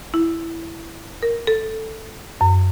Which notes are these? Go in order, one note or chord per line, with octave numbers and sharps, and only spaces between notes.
E4
A#4
A4
F#2